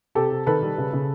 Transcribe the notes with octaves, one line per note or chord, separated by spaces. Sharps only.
C3 G4 A4
C3
D#3 A4 B4
G3
C#3
C#3